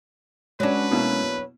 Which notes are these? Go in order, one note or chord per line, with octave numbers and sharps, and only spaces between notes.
F#3 G#3 C#4 D4 B4
B2 A#3 E4